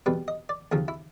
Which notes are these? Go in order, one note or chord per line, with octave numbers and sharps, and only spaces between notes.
E2 B2 G3 B4
D#5
D5
D#2 C#3 F3 G#4
E4